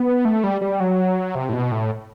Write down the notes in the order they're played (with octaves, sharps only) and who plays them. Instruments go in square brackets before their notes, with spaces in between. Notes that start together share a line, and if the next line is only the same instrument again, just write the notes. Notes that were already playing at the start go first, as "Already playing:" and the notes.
Already playing: [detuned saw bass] B3
A3
G3
G3
F#3
C3
A2
B2
A2